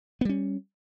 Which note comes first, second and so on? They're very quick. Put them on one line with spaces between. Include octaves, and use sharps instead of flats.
B3 G3 C#4